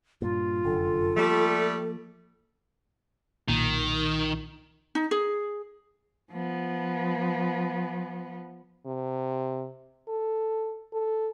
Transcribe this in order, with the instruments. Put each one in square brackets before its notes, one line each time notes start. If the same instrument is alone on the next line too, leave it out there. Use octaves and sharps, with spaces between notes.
[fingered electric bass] G2 A#2 [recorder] F4
[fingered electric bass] F1 F#2 D3 [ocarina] A4
[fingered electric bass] F3 A#3 [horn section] G3 A3
[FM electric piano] B1 A#2 [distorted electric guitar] D#3
[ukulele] D#4
G#4
[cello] F3 B3
[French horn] C3
A4
A4